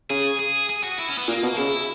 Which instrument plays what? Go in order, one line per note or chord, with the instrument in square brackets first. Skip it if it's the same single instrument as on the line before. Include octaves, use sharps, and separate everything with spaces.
[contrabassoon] C#3 [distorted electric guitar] G#4
[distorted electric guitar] G#4
G#4
F#4
E4
C#4
B3
[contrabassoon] A#2 [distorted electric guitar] A#3
[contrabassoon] B2
[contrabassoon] C#3 [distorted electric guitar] E4